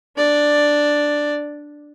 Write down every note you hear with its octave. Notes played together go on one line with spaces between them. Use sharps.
D4 D5